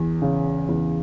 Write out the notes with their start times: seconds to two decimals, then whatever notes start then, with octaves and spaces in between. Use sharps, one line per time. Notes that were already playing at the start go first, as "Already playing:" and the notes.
Already playing: E2
0.22 C#3
0.69 E2